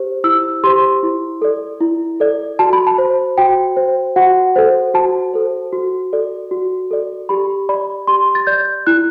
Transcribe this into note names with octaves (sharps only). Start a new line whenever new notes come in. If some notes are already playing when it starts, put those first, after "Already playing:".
Already playing: G4 C5
E4 E6
G4 C5 C6
E4
A4 D5
E4
A4 D5
F#4 A5
B5
A5
C5
F#4 G5
C5
F#4 F#5
A4 C5
F#4 A5
A4 C5
F#4
A4 D5
F#4
A4 D5
G4 B5
D5 B5
G4 C6
A6
D5 G6
E4 F#6